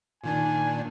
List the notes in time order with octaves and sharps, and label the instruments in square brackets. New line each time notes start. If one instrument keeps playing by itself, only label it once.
[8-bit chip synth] A#2 D#3 D4 [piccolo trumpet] G#5